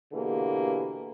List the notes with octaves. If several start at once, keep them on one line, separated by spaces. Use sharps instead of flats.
B2 D3 E3 A#3 G4 G#4